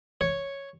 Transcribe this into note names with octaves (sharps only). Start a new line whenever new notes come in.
C#5